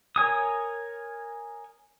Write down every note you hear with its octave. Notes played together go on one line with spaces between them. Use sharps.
A#4 C#5 G#5 D#6